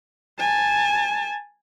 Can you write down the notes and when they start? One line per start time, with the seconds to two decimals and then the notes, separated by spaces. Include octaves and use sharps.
0.40 G#5 A5